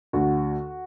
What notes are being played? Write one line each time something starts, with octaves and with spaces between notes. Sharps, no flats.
D2 F#4